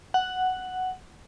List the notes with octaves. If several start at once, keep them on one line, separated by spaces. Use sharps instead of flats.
F#5